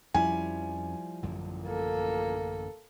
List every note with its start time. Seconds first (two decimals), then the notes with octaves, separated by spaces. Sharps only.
0.14 F2 F3 G3 C#4 E4 G#5
1.23 A1 F#2 D3
1.66 A#3 A4